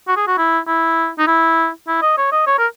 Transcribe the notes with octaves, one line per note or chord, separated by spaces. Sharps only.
F#4
G#4
F#4
E4
E4
D#4
E4
E4
D#5
C#5
D#5
C#5
A#4